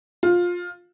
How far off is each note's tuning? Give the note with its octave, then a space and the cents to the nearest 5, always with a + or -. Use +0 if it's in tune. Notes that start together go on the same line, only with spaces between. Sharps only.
F4 +15